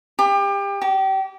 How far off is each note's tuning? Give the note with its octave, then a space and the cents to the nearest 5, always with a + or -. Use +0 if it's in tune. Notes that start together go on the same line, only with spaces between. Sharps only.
G4 +30
G4 -30